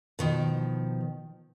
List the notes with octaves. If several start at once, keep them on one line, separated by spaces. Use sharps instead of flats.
B2 D#3 F3